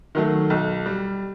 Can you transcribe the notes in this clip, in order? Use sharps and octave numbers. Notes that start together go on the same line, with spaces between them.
D#3 F#3 A3
B1
G3